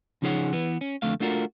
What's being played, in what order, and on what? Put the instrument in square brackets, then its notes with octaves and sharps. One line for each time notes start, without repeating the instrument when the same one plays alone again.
[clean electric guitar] C#3 F3 D#4 G#4 C#5 F#5
E3 B3
C#4
F2 D3 A3 F5
A3 D4 F4 F#4 A#4